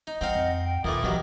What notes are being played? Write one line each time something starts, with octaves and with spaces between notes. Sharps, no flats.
D#4
G3 C4 D#4 D#5 F5 F#5
F2
G5
D#2 A#2 E3 A3 D6 D#6
G2 D#3 E3 F#3